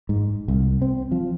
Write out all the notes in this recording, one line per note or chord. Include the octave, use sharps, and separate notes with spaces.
G#2
C2
C4
F3